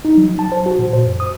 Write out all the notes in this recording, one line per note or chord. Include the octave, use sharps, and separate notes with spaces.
D#4
F#3
A5
C5
F#4
A#2
C5
F#2
D#6